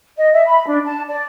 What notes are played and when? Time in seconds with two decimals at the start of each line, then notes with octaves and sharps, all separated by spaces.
0.18 D#5
0.33 E5
0.47 B5
0.67 D4
0.86 A5
1.09 D5